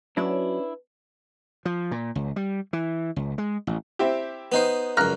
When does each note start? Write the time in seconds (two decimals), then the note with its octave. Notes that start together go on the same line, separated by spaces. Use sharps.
0.17 F#3 C#4 D4 E4 B4 D5
1.65 F3
1.91 A#2
2.15 C#2
2.36 G3
2.73 E3
3.16 C#2
3.38 G#3
3.67 A1
3.99 C4 E4 G4
4.52 B3 D#4 C5
4.97 C#2 F#2 A#5 F6 F#6